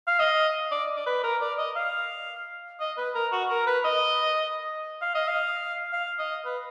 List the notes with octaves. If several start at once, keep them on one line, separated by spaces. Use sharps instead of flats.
F5
D#5
D5
D5
B4
A#4
D5
D#5
F5
D#5
B4
A#4
F#4
A#4
B4
D#5
F5
D#5
F5
F5
D#5
B4